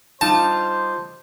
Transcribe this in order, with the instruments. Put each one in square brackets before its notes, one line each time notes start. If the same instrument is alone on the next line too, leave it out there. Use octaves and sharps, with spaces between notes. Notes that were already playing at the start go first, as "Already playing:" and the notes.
[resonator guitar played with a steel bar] G3 D#4 F4 [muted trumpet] C5 [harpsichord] A5